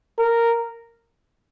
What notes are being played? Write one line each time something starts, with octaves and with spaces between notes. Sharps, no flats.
A#4